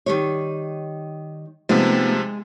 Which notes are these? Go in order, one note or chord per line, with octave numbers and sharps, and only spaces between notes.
D#3 G3 C#5
C3 F3 G#3 A3 B3 D#4